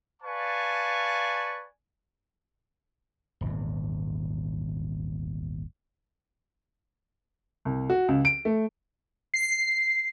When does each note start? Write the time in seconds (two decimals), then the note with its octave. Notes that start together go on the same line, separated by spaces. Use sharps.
0.22 B4 D5 F5 G#5 A5 C#6
3.41 D#1 G#1 E2
7.65 C2
7.90 F#4
8.08 C#2
8.25 D7
8.45 A3
9.34 C7